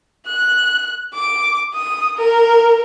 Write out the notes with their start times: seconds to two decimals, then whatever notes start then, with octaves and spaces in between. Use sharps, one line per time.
0.27 F#6
1.14 D6
1.74 D#6
2.17 A#4